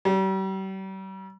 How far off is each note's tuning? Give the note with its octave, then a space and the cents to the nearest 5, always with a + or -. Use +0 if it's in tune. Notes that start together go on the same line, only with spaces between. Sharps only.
G3 -40